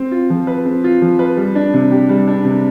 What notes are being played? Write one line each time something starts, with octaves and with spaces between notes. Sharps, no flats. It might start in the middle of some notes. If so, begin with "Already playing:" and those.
Already playing: C4
F4
F3
B4
C4
F4
F3
B4
G3
D4
C3
G4
G3
D4
C3